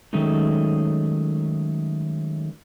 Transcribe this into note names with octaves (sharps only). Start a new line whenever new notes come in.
D#3 F#3 G#3 A3 C#4 D#4